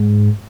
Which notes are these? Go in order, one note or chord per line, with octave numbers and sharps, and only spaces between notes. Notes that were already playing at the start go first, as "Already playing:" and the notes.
Already playing: G#2